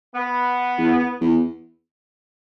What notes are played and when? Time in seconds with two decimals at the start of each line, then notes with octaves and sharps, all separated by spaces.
0.13 B3
0.78 E2
1.21 E2